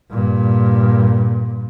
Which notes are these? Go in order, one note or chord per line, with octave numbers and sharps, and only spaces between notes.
G2 A#2